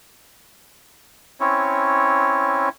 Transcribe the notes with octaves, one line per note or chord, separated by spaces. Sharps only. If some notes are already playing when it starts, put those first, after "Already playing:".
C4 C#4 E4 C#5